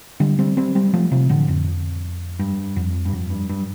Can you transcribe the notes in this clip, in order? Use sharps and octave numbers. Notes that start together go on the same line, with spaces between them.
D3 G3
G3 C4
G3 C4
G3 C4
F3 A3
C3 F3
A2 D3
F2
G2
F2
G2
F2
G2
G2